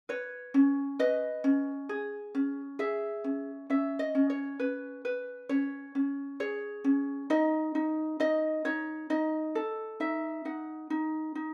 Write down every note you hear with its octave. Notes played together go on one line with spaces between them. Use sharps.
B4 C#5
C#4
B4 D#5
C#4
G#4
C#4
G#4 E5
C#4
C#4 E5
D#5
C#4
C#5
C#4 B4
B4
C#4 C#5
C#4
G#4 C#5
C#4
D#4 D#5
D#4
D#4 D#5
D#4 C#5
D#4 D#5
A4
D#4 E5
D#4 F#5
D#4
D#4